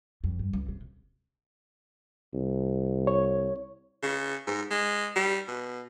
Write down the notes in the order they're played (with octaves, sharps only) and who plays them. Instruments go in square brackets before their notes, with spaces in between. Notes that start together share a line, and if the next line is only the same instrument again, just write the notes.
[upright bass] F2
G2
C#2
C3
[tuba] C2
[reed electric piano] C#5
[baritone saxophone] C#3
G#2
G#3
G3
B2